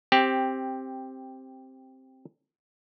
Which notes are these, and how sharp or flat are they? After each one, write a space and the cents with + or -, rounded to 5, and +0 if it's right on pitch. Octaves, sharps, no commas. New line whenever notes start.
C4 +5 G4 +0